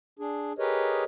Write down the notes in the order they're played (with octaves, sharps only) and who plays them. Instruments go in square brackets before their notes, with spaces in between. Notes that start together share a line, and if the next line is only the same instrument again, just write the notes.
[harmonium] D4 G#4
G4 G#4 A#4 B4 C#5 D#5